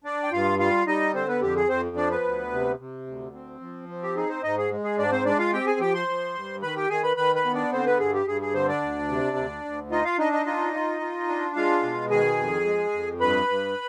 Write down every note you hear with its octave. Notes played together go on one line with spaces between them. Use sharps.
D4 D5
G5
G2 F4 F5
G3 F4 F5
G3 D#4 D#5
D3 C4 C5
B3 B4
F2 G4
G#4
F2 C4 C5
F3 D4 D5
B3 B4
D2
C3
C3
D2
C4
F3
C4
G4
D#4 G#4
C4 C5
G#2 D#4 D#5
G#4
G#3
G#4
G#2 D4 D5
C4 C5
G#3 D4 D5
F4 F5
C4 G4 G5
G#4 G#5
F3 G4 G5
C5 C6
F3
G2
D#3 B4 B5
G4 G5
D#3 G#4 G#5
B4 B5
D#3 B4 B5
B4 B5
B3
D4 D5
D3 C4 C5
B3 B4
G2 G#4
G4
G2 G#4
G#4
D3 C4 C5
D4 D5
D2
C3
D2
D2
D#4 F4 D#5
F4 F5
D4 D#4 D#5
D#4 D#5
D#4 F4 D#5
F4
F4
D4
G#3 F4 F5
B2
D#3 G#4 G#5
F2
G#3
F2
G2 B4 B5
G2